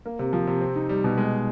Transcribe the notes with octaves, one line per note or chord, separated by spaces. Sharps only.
A#3
C3
F3
C3
C4
D#4
G3
B2
G#3